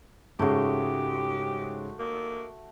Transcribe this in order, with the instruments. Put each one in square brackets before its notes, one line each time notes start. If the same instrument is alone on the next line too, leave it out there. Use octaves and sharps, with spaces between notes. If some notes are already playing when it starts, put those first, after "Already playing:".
[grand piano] G#2 C#3 G#3 [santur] A3 F#4 [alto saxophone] G4
[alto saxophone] A#3